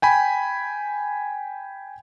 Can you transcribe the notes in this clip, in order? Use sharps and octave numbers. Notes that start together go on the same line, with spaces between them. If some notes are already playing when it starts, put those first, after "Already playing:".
G5 G#5 B5